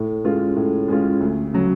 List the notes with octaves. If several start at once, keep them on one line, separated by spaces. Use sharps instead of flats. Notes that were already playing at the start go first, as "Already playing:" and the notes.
Already playing: A2
G#3 C#4 F4
A2
G#3 C#4 F4
D2
C#3 F#3